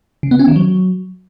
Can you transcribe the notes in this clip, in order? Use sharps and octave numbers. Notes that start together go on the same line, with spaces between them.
C#3
B3
C#4
D#3
F#3